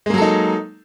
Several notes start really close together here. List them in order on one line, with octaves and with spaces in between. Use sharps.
G#3 A#3 F#3 A4 D#4